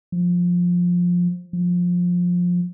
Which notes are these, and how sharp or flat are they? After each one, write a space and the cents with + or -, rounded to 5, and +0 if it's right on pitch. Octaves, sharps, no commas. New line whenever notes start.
F3 +15
F3 +20